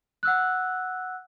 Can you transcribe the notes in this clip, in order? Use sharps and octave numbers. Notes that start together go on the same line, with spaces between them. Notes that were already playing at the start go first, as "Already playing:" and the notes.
F#5 E6 F#6